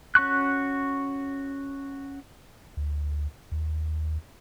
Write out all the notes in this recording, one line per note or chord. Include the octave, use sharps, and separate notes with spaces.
C#4 F#4 C#6 F#6
D2
D#2